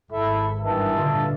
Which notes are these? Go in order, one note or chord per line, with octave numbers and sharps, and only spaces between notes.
G#1 E4 A4 E5
G2 D#3 E3 D#5 E5 A5
G2 A#2 D3 F4